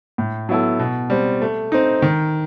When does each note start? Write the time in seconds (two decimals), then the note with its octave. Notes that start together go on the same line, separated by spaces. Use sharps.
0.18 A2
0.49 F#3 B3 E4 A4
0.79 B2
1.10 G3 C4
1.42 A3
1.72 C4 D#4
2.02 D#3